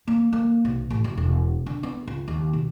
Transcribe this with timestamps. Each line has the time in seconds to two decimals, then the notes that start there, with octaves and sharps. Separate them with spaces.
0.07 A#3
0.33 A#3
0.65 B1
0.90 A1
1.04 F#1
1.17 E1
1.66 D3
1.83 B3
2.07 C#2
2.28 D#2
2.53 B1